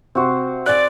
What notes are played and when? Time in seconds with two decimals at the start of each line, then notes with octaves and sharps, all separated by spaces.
0.15 C3 C4 F#4 C5
0.66 D5 G#5 F#6